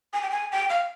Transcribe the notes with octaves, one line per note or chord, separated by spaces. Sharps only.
G#5
G5
G#5
G5
F5